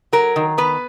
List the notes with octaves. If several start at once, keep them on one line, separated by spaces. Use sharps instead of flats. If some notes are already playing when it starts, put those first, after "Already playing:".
F#3 A#4
D#3
B3 B4